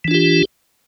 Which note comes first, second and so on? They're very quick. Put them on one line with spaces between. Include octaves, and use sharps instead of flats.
E3 D4 F4 G4